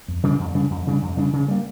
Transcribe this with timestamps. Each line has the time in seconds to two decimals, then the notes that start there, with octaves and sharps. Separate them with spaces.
0.08 F2
0.23 C#3 G3 D4
0.40 F2
0.55 C#3 G3 D4
0.70 F2
0.87 C#3 G3 D4
1.02 F2
1.17 C#3 G3 D4
1.33 C#3
1.48 G3 A#3